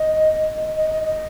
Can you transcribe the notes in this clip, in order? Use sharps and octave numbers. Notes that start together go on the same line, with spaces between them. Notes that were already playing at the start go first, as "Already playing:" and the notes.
Already playing: D#5
D#5
D#5
D#5